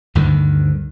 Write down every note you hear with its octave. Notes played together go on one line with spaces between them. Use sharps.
D2 G2 D3 D#3